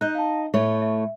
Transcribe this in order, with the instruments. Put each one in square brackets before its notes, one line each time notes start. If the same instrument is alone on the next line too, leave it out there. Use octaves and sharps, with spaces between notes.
[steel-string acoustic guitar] D#4 D#5 [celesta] F#6 G6
[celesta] F5 A5
[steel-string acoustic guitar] A2 A3 C#5 [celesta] E5
[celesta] E5